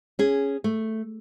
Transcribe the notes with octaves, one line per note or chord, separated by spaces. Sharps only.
C#4 G#4
A3